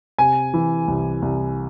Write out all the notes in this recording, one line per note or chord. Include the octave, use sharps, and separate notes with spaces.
C3 G#5
E3
C2
C2